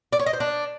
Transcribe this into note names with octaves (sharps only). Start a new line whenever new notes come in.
D5
C#5
D#5
C5
D4